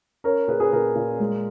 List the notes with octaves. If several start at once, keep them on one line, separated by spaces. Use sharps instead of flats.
C#4 A#4 C#5
A#2 G#4 B4
G#4 B4
A#2 A#4
A#2
G#3